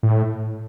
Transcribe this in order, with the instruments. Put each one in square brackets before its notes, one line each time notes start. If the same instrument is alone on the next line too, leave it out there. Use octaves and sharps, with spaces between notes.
[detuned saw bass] A2